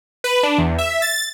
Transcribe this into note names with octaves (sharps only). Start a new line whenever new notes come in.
B4
D4
E2
E5
A6